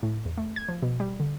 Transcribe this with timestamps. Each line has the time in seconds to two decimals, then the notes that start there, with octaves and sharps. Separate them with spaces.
0.03 A2
0.25 E2
0.38 A3
0.56 G#6
0.68 F3
0.82 B2
1.00 G3
1.20 D3